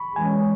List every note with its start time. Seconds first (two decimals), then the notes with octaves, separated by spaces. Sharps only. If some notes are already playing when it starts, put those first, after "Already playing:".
Already playing: B5 C#6
0.16 E3 G#3 C#4 G#5